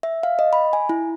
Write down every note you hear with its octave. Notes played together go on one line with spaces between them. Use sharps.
E5
F5
D#5
B5
G#5
E4